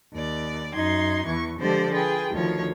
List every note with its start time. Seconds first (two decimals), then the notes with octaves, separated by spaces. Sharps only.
0.13 D#2 D5
0.74 F#2 D#4 C6 G#6
1.26 E2 E3 C#6
1.58 D3 F3 G#3 G4 C5 D5
1.92 F4 G#4 B4 G5
2.31 D2 D#3 F3 F4 C#5